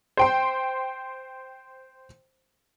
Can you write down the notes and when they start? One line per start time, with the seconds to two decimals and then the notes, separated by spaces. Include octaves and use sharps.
0.17 C5 G5 C6